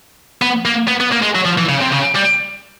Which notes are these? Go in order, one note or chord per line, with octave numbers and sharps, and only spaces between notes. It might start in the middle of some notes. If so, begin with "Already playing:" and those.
B3
A#3
B3
B3
A#3
G#3
F#3
F3
E3
C#3
C3
C#3
G3